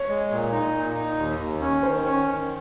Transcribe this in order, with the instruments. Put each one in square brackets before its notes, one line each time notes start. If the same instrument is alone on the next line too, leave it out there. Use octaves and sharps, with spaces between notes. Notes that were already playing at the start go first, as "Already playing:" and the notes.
Already playing: [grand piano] C#5
[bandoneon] G#3
A#2
D#4
A#2
D#4
D#2
D#2
C#4
[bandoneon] D#3 [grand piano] C5
[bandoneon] C#4
D#3